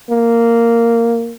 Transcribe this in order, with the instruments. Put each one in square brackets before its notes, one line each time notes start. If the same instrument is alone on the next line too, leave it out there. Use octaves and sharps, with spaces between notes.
[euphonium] A#3